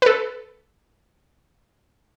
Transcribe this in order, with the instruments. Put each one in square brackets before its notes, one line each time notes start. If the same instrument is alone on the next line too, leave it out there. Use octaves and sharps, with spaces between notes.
[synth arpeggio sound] A4 B4